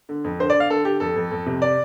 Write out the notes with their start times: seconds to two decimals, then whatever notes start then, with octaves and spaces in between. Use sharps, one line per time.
0.09 D3
0.24 F2
0.39 D3 C5
0.50 D5
0.55 D3 F5
0.70 D3 A4
0.85 D3 G4
1.00 F2 A4
1.16 F2
1.31 F2
1.46 C3
1.62 D5